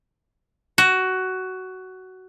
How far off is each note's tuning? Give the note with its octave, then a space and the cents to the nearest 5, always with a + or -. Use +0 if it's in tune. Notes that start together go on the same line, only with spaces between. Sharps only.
F#4 +15